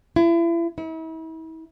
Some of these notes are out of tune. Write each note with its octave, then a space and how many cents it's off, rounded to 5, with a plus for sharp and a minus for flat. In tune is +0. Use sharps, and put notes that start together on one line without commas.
E4 +35
E4 -40